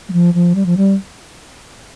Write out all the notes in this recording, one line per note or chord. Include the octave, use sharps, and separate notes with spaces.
G3
F3
F3
G3
F3
G3